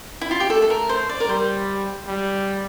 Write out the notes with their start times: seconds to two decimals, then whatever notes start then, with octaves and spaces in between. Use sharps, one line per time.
0.21 E4
0.31 F4
0.40 G4
0.50 A3 A4
0.62 A4
0.70 A#4
0.89 C5
1.09 D5
1.20 A#4
1.28 G3 C5
2.07 G3